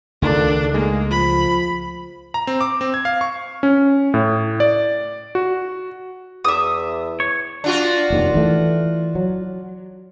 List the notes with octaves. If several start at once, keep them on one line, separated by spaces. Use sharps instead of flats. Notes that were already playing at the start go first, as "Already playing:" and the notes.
C#2 D#3 A3 D4 A4
G#3 A#3
F3 B5
A#5
C4
D6
C4
G#6
F5
C#6
C#4
A2
D5
F#4
E2 E5 D#6
C#5
D4 F4 F#4
F1 D#2 D#3
E3 A3
F#3